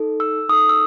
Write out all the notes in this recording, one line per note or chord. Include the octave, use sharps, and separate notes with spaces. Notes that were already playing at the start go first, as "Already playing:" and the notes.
Already playing: D#4 A4
E6
D#4 A4 D#6
E6